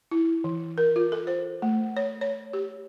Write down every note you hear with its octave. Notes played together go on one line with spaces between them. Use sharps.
E4
E3
A#4
F4
A4
C5
A3
C#5
C#5
G4